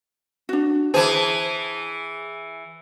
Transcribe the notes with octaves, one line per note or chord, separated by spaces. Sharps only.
D4 F#4
E3 G#4 C5 A5